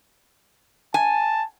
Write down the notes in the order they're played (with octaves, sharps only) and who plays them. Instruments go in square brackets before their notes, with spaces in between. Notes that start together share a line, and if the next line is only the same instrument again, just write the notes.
[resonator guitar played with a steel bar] G#5 [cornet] A5